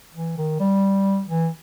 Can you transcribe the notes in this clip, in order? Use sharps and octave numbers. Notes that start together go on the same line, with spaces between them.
E3
D#3
G3
E3